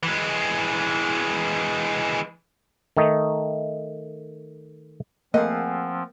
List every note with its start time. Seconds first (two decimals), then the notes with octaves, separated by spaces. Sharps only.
0.03 E3 G#3
2.97 D#3 A3 D#4
5.34 F3 A3 A#3 C4 G#4 B4 D#5 F#5